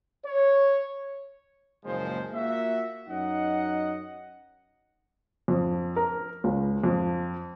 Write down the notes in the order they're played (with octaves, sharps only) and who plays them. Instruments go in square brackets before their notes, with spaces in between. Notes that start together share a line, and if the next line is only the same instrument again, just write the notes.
[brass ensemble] C#5
F#1 A#2 F3 G#3 C5
A#3 F4 F#4 E5
F#2 D#4 D#5 F#5
[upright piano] F2
A#4
C#2
F2